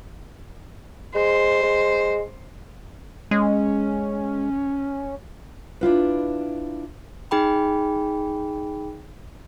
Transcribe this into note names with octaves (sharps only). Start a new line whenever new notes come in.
G#3 C5
G#3
G#3 C#4
D4 E4 F4 B4
D#4 G#4 G5 B5